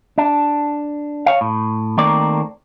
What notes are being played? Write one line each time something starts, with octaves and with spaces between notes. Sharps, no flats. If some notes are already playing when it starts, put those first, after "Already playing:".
D4
C#5 F5
A2
D#3 A3 A#3 C4 A#4 D5